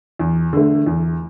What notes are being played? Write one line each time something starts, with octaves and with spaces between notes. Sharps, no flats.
E2
D3 A3
E2